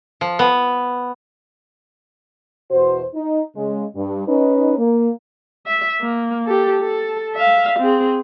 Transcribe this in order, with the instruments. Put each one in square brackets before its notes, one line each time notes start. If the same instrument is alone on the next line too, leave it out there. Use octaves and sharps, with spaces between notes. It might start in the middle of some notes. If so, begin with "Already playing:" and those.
[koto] F3
B3
[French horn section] E2 B2 F#4 C5
D#4
C#3 G#3
G2
C#4 D#4 B4
A#3
[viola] E5
A#3
G4 A4
A4
E5 F5
C4 G#4